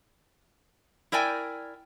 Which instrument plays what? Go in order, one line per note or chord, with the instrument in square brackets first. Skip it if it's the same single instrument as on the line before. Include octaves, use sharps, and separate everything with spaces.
[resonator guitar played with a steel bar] E4 A#4 D5 G5 G#5